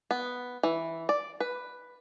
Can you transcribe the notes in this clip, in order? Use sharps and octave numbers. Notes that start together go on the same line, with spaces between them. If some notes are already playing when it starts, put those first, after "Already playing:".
B3
E3
D5
B4